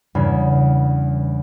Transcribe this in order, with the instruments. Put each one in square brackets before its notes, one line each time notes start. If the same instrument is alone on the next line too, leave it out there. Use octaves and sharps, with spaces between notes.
[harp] E2 G2 C#3